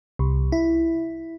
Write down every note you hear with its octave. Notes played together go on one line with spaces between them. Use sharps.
C2
E4